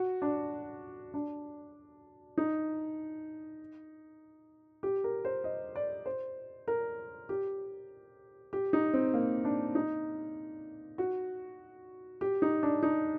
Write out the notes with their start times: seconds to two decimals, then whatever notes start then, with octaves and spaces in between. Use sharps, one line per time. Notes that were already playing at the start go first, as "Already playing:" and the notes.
Already playing: F#4
0.22 D4
1.14 D4
2.38 D#4
4.83 G4
5.04 A#4
5.25 C5
5.44 D#5
5.76 D5
6.06 C5
6.68 A#4
7.29 G4
8.53 G4
8.73 D#4
8.93 C4
9.14 A#3
9.45 D4
9.75 D#4
10.98 F#4
12.21 G4
12.42 D#4
12.63 D4
12.83 D#4